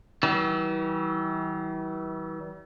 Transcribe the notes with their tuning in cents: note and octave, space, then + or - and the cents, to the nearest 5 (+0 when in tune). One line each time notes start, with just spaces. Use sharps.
E3 -35 G3 -45